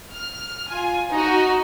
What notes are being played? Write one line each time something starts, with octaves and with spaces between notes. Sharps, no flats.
F6
F4 G#5
D#4 F#4